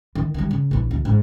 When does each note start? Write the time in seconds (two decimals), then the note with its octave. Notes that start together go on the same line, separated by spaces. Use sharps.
0.15 D#3
0.34 D#3 G3
0.51 C#3
0.71 A#1 E3
0.91 D2
1.05 G#2